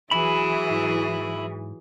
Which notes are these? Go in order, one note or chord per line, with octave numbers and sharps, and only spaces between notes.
E1 E3 F#3 E4 G#4 B5
G#2